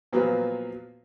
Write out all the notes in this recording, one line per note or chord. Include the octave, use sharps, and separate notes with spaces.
A#2 F3 F#3 B3